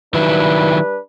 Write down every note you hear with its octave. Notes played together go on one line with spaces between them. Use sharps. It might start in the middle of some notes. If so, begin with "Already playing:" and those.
D#3 F#3 G3 D4 E4 B4